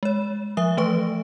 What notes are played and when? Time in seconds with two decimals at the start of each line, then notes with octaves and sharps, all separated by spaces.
0.03 G#3 C#5
0.57 F3 E5 D#6
0.77 E3 A3 B4 C#6